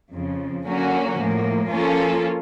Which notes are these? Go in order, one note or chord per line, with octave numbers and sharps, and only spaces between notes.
F2 C#3 F3
D3 F#3 A#3 C#4 F#4
A2 F3 A#3
F3 A#3 C#4 F4 A4